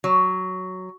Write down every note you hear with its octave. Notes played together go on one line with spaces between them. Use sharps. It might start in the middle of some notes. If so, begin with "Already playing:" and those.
F#3